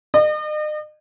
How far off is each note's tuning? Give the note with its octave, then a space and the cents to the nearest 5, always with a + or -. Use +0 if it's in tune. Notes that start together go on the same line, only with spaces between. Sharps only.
D#5 -40